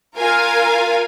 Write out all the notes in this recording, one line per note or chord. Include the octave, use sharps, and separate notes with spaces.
F4 A#4 F5 G#5